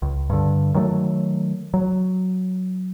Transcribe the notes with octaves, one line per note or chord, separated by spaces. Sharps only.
C#2
G2 D3
D#3 F#3 A3
F#3